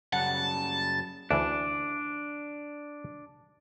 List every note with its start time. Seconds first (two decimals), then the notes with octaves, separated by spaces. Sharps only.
0.13 F#2 C#3 G3 F#5 A5
1.31 D2 E3 D4